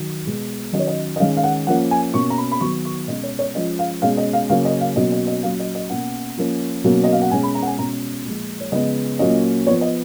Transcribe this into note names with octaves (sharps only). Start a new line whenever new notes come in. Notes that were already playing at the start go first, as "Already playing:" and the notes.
Already playing: D#3 F#3
B2 G#3 B3
D#3 F#3 C#4 D#5
C#5
D#5
D#5
D#3 G#3 C#4 F5
F5
F#5
F3 A#3 C#4 F#5
G#5
B2 A#3 C#4 C#6
A#5
B5
B5
D#3 F#3 B3 C#6
C#6
B2 G#3 C#4 D#5
C#5
C#5
F3 G#3 C#4 D#5
F5
B2 G#3 C#4 F5
D#5
F5
C#3 F#3 A#3 C#4 F5
D#5
F5
B2 F#3 A#3 C#4 D#5
D#5
D#5
A#2 F#3 C#4 F5
D#5
D#5
B2 A#3 C#4 F#5
F3 A#3 C#4
B2 F#3 A#3 C#4
D#5
F5
F#5
B2 G#3 C#4 G#5
B5
A#5
F#5
G#5
B2 G#3 C#4 A#5
A#2 F3 G#3
C#5
C#3 F3 G#3 B3 D#5
A#2 F#3 A#3 C#4 D#5
F3 B3 C#5
D#5